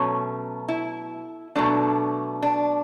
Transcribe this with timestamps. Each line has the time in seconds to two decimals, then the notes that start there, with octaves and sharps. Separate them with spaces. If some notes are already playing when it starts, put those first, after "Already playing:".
Already playing: B2 F#3 A3 C#4
0.68 E4
1.55 B2 F#3 A3 D4
2.42 D4